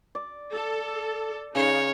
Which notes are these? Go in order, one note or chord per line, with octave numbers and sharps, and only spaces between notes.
D5
A4
C#3 D#4 C#5 F5